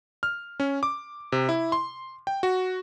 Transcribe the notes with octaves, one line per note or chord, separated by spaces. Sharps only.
F6
C#4
D6
C3
E4
C6
G5
F#4